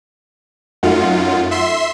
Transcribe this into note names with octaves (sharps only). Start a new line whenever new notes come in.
F#2 A3 D#4 F4 F#4
E5 C6